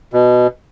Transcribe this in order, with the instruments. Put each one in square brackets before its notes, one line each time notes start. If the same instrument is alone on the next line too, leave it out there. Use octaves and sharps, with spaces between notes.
[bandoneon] B2